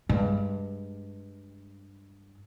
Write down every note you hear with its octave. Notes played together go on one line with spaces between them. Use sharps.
G2 G#3